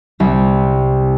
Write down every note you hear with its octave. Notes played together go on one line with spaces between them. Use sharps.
C2